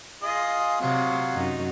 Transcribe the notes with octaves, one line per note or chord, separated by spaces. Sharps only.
F4 G#4 D#5
C3 F#3 F4 F#4
F#2 D#4